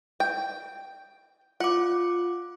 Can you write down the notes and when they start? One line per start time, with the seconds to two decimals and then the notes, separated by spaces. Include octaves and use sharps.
0.20 G5
1.60 F4 F#5 D6